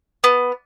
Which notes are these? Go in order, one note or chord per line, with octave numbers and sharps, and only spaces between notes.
B3